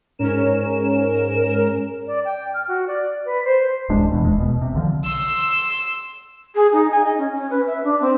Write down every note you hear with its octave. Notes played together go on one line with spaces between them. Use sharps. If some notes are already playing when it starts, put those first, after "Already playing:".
G#2 C#4 A#4 E7
D5
G5
F6
F#4
D5
B4
C5
D1 A1 G#3 D4
E2 B2
D#1 G#3
B2
C3
B1 D3 F3
C6 E6
G#4
D#4
G#5
D#5
C#4
C#4
B4
E5
D4
C4